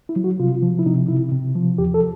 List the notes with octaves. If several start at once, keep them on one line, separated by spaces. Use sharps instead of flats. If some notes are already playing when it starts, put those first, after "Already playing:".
E4
F#3
F#4
C3 F4
F3
E4
C3 D#4
C3 E4
C3
F3
E2 G4
A4